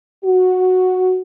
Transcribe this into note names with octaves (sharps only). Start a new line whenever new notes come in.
F#4